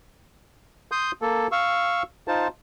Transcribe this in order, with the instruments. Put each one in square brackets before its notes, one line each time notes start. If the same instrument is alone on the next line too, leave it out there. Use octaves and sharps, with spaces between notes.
[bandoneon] C6 D#6 G6
A#3 A4
F5 C#6 E6
D#4 F4 C5 A5